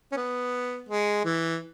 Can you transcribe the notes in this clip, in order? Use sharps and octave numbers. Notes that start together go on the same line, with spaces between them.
C#4
B3
G#3
E3